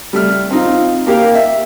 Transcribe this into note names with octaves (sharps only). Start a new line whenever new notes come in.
G3 A3 F6
C4 D#4 F4
A#3 G4 A#4 F5
E5